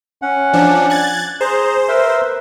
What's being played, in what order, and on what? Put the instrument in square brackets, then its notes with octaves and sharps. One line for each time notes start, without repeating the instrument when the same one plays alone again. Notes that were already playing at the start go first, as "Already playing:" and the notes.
[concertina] C#4 F#5
[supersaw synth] F3 D4
F#6 G#6 A6
[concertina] G#4 A#5 [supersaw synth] C5
[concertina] A#4 B4 E5